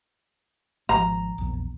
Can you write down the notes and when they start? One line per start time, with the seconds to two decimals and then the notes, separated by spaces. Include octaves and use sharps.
0.89 G#1 B2 F3 A#5
1.38 A#1 E2